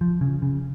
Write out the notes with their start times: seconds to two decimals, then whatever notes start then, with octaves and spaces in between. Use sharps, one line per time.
0.01 F3
0.21 C#3
0.42 C#3